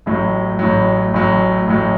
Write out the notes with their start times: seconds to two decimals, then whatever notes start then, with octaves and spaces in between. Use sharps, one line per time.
0.06 A1 A2 F#3
0.59 A1 A2 F#3
1.14 A1 A2 F#3
1.67 A1 A2 F#3